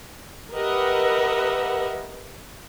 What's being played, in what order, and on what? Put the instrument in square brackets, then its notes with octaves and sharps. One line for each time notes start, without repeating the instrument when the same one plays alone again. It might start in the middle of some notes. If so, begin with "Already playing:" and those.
[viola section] G4 A#4 B4 D#5 E5 F#5